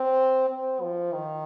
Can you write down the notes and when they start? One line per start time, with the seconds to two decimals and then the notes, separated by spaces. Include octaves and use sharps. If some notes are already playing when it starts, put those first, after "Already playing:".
Already playing: C4
0.49 C4
0.82 F3
1.13 D#3